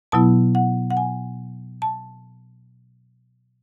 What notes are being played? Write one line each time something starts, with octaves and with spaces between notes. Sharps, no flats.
B2 F#3 B3 E4 A5
F#5
F#5
G#5
A5